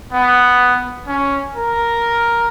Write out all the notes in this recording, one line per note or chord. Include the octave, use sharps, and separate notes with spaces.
B3
C#4
A#4